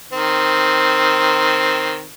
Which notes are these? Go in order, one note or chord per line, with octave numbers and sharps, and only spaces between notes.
D#3 C4